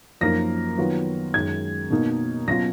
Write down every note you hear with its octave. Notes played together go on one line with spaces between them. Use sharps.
F#2 F3 A#3 D#4 A#6
D#3 F#3 B3 F4
F#2 D#3 G#3 G#6
B2 A#3 D#4
B2 F#3 C#4 F4 A#6